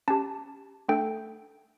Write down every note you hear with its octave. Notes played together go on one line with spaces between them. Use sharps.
C#4 G4 A5
A3 D4 A4 G5